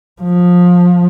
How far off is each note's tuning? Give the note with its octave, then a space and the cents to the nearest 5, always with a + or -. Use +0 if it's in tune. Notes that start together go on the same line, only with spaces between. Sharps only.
F3 +20